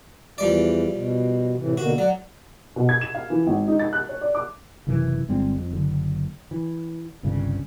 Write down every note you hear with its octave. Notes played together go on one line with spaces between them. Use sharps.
E2 E3 F3 G3 D5
B2
A2 C3 E3
B2 D3 A#3 F#4
F#3 D5 F#5
B2
G#6
E7
F5
E3
G#1
D#4
A6
F#6
C#5
D5
D6
F#1 C3 D#3 E3
G1 G3 G#3 C4
F2
F#1 D3
E3
G1 C2 G2 C#3